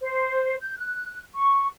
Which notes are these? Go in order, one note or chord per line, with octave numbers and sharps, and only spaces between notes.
C5
G6
F#6
C#6